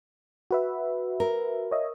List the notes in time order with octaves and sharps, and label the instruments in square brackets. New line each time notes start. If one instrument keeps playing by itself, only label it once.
[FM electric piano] F#4 B4 E5
[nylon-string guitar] A#4
[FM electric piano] C#5 D#5 E5